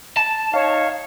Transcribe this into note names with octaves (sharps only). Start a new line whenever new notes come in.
A5
D#4 C#5 F5